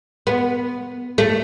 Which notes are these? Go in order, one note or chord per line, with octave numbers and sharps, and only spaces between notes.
B3
A3